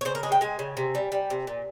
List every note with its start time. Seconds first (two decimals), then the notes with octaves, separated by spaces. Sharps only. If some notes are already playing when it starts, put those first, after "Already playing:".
0.01 C#5
0.05 C#3 C5
0.15 A#4
0.23 G#3 G#4
0.32 G5
0.41 G#3 G#5
0.59 C#3
0.77 C3
0.95 G3
1.12 G3
1.30 C3
1.47 A#2